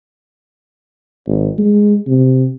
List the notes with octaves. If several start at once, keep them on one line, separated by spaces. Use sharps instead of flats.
G#1
G#3
C3